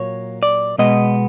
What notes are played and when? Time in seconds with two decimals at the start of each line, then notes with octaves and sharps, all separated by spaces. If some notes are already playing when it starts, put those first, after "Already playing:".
Already playing: A#2 F#3 A#3 C#5
0.43 D5
0.78 B2 G#3 B3 D#5